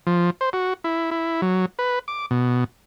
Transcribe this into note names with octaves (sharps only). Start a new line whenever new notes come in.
F3
C5
F#4
E4
E4
F#3
B4
D6
B2